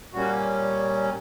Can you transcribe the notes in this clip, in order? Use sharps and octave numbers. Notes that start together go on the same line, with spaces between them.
A#2 G3 A#3 C#4 F#4